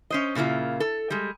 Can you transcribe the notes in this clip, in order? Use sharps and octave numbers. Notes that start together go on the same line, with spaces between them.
C#4 C5 D#5
A#2 C#3 A#3 E4 F4
A4
G3 G#3